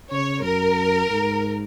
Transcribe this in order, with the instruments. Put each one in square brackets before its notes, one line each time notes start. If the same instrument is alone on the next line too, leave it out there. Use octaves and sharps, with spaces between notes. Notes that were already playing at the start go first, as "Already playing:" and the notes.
[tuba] C#3 [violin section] C#5
[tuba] F#2 [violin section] A#4
[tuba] G#2